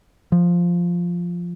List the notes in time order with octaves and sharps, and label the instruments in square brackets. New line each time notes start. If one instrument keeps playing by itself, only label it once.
[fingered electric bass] F3